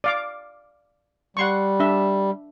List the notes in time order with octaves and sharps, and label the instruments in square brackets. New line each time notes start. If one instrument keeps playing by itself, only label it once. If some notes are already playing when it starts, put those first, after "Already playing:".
[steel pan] D5 F5 D6
[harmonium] G3 [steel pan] F#5 C6 C#6
[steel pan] D4 E5